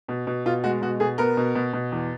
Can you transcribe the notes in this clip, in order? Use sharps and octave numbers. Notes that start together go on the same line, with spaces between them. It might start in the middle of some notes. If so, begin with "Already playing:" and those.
B2
B2
B2 F4
G#3 F#4
B2 F#4
B2 G#4
B3 A#4
B2
B2
B2
E2